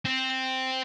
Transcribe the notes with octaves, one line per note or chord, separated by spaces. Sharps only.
C4